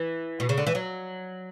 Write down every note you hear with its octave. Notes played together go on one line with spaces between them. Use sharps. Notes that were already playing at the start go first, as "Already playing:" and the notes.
Already playing: E3
B2
C#3
D3
E3
F#3